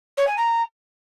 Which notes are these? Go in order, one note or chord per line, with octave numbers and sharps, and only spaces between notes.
C#5
G#5
A#5